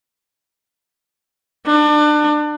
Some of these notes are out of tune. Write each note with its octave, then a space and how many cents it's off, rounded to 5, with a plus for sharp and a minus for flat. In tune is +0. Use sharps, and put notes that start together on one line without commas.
D4 +30